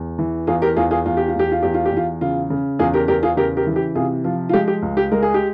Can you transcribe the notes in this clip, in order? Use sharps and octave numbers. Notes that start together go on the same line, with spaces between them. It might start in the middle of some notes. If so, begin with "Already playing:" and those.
Already playing: E2
E3
E2 F4 G#4
G4 A#4
E2 F4 G#4
F4 G#4
E2 F4
G4
F4
E2 G4
F4
E2 G4
F4
G4
E2 F4
C#3 F4
C#3
E2 F4 G#4
G4 A#4
E2 G4 A#4
F4 G#4
C#3 G4 A#4
G4 A#4
E3
G4
C3 F4 G#4
F3 F4
F4
G#3 G4
G4
C#2
G4
G#3 A#4
G#4
G4